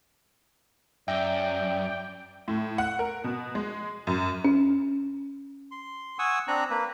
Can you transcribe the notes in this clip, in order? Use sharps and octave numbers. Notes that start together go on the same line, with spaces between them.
F#2 D5 E5 G5
A2
F#5
A#4
B2
G#3
F#2
C#4
C6
F#5 G#5 C#6 D#6 E6
C4 D4 A#5 F#6
A#3 B4